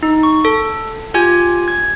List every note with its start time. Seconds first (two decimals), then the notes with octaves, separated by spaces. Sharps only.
0.03 D#4
0.23 C#6
0.45 A4
1.14 F4 G4 G#5 G#6
1.68 G#6